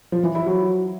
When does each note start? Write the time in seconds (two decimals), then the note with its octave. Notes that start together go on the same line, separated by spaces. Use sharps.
0.12 F3
0.24 E3
0.35 E4
0.46 F#3